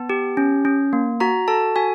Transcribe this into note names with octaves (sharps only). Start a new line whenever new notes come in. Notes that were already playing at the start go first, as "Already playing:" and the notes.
Already playing: B3 A5
G4
C#4
C#4
A#3
F#4 A#5
A4 A5
F#4 G#5